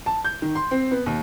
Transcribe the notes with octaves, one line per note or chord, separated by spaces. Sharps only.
A5
G6
D#3
C6
C4
B3
D#2